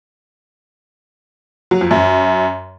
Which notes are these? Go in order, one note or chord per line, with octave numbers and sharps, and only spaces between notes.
F#3
F2
F#2